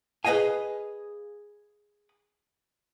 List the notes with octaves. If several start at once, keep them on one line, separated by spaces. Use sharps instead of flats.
G#4 B4 C#5 D#5 F5 G#5